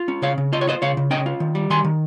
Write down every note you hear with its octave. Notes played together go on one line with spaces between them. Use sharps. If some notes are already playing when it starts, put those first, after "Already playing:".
Already playing: F4
C#4
C#3 C#5 F5
C#3
F4 D#5
C#5
F4 C5 D#5
C#3 C#5 F5
C#3
C#4 D#5 G5
F4
D#3
G3
D#3 G#5 C6
D#3